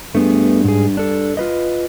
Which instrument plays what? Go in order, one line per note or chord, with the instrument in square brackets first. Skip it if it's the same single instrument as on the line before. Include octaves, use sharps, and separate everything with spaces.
[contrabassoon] G2 [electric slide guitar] A3 B3 G#4
[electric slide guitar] G#2 G#4
D4 A4
F4 B4 D#5